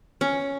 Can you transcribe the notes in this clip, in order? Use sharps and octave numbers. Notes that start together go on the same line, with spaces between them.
C#4